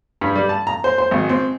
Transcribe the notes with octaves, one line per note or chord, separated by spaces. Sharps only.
G2
G3
A5
A#5
C5
C5
G#1
C4